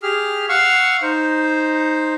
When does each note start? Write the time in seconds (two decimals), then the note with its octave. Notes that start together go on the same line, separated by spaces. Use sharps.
0.03 G4 G#4 F6
0.49 F5 F#5 C#6 E6 F6
1.02 D#4 C5